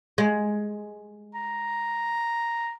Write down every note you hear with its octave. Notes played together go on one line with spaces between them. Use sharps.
G#3
A#5